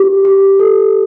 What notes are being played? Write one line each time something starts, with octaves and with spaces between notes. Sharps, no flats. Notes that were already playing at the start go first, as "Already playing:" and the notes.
Already playing: G4
G4
A4